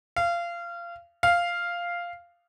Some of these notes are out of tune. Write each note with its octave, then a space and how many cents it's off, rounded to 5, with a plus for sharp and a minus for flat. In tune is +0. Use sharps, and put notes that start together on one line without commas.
F5 -25
F5 -5